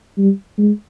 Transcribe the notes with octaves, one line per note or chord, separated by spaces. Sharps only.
G3
G#3